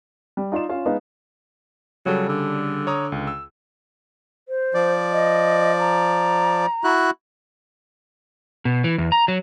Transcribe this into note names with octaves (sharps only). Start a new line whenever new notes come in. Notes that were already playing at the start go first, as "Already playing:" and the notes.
G3
D#4 F4 D5 C6 E7
C#4 F4 F5
G#3 B3 D#4 F5
C#3 F#3 G3 A4
D3
C#5 A#5 D#6
C#2
E6
C5
F3 D5
D#5
A#5
E4 F#4 F#6
B2
E3
E2
A#5
F#3